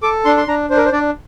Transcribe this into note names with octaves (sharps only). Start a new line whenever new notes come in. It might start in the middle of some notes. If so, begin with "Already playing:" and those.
A4 D6
D4 C6
C6
D4 A#5
D4 C5
A#4
C5
D4 D5